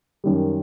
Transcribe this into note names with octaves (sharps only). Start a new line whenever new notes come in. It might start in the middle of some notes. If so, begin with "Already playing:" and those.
F#2 D#3 G3